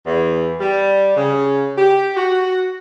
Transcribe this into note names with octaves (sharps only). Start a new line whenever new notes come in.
E2
G3
C#3
G4
F#4